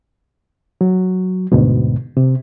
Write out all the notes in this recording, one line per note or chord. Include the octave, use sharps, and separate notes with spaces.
F#3
D2 G#2 B2
C3